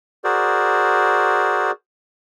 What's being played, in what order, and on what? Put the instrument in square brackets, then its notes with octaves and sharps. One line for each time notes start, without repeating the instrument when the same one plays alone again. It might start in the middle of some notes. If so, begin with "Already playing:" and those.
[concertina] F#4 G#4 A#4 C5 D5